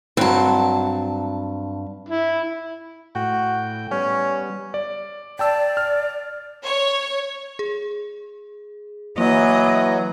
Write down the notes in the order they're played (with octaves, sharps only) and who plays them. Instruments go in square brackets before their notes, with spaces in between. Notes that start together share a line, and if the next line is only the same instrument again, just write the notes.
[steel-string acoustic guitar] G2 A5 [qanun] F#3 C4
[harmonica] E4
[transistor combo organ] A2 G5 [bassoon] F#4
[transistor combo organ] G3 B3 [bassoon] C#4
[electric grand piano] D5
[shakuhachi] D5 [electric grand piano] G5 A5 E6
[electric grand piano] F6
[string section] C#5
[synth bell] G#4
[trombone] E3 [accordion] F#3 [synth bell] A#3 [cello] D#5